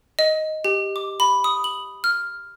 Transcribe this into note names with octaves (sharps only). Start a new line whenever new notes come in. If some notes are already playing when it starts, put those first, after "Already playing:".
D#5
G4
D6
B5
D#6
F#7
F6